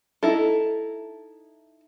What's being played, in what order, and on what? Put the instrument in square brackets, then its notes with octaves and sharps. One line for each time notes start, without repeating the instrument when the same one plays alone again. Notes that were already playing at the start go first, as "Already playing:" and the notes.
[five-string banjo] D#4 E4 A4